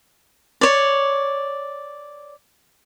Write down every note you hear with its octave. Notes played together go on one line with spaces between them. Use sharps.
C#5 D5